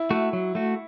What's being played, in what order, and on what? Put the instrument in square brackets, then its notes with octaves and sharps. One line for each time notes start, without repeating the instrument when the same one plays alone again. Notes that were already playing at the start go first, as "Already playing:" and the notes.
Already playing: [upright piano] E4
[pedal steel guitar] A3 F#4
F#3
A3 F#4